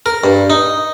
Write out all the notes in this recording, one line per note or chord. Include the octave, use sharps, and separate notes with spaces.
A#4
G2
D#4